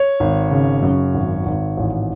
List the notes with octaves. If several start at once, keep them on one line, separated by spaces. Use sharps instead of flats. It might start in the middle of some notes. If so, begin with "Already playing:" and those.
Already playing: C#5
G#1
C#3
F#2
G#1
G#1
A1